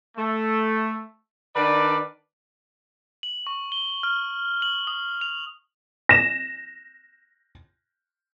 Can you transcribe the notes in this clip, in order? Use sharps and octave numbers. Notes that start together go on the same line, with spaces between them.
A3
D#3 D4 B4 D5
F#7
C#6
G7
F6
F#7
D#6
F7
A#6 E7